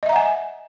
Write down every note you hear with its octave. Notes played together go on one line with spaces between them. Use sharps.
D#5 E5 F#5 G#5 A#5